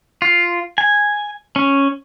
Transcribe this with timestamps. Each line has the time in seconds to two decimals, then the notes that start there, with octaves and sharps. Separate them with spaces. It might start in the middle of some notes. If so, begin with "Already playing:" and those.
0.22 F4
0.78 G#5
1.56 C#4